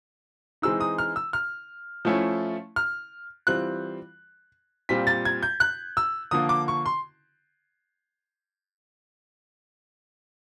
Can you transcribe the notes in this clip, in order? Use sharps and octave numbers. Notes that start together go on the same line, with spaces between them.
E3 G#3 C4 D#4 E6
D#6
F6
E6
F6
F3 A3 C#4 E4
F6
E3 G3 C4 F4 F#6
A#2 G3 C4 F4 B6
A6
G#6
G6
F#6
E6
D3 F3 A#3 D#6
D6
C#6
C6